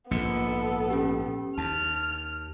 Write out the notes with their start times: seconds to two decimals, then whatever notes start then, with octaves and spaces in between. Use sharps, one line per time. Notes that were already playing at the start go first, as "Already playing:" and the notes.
0.11 A#1 G#2 A#3 B3 A4 C#7
0.90 C#4 G4
1.58 D#2 A5 F6